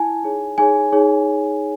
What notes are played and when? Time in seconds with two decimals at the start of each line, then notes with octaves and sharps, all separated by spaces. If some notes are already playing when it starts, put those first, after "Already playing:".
Already playing: E4 G#5 A5
0.23 D#4 G#4 C#5
0.57 D#4 G#4 C#5 G#5
0.92 D#4 G#4 C#5